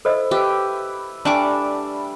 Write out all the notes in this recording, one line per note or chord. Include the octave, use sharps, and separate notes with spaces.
E4 A4 C5 D#5
G4 B4 E5 D6
G3 A3 D4 G#5 A5 C#6 D6